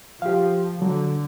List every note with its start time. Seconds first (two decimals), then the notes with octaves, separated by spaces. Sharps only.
0.22 F3 G4 F5
0.82 D3 F#3